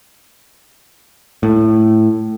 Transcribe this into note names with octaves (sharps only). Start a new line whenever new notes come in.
A2